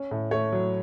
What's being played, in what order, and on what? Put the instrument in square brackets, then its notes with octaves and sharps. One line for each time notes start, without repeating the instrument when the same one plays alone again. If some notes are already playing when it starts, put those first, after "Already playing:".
Already playing: [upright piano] C#4
A2
A3 C#5
F#3